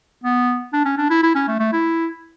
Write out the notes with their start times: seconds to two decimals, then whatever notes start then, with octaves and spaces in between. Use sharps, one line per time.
0.23 B3
0.73 D4
0.85 C#4
0.98 D4
1.10 E4
1.23 E4
1.35 C#4
1.48 A3
1.59 A3
1.72 E4